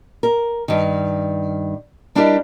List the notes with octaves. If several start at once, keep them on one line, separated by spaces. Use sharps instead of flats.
A#4
G2 D#3
G3 D4 E4 G4 A#4 D#5